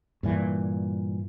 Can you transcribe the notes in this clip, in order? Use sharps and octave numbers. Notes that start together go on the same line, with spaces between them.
G2 A#2 E3